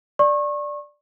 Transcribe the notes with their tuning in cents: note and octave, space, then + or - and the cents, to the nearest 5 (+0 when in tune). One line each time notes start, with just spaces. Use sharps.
D5 +0 C#6 -30